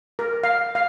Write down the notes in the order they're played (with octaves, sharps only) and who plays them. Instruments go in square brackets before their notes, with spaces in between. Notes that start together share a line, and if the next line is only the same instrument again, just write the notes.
[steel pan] A#4
F5
F5